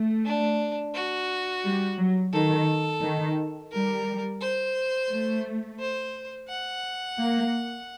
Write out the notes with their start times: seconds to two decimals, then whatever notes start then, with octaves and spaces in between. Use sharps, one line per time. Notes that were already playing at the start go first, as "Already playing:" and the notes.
Already playing: A3
0.25 D4
0.95 F#4
1.64 G3
1.98 F#3
2.33 D#3 A4
3.02 D#3
3.72 G3 A#4
4.41 C5
5.10 A3
5.79 C5
6.49 F#5
7.18 A#3